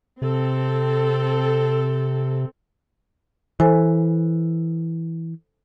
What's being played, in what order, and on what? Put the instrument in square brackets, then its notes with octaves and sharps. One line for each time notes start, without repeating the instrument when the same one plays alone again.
[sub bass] C3 [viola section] C4 A4
[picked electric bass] E3 [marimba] A4 C5 G#5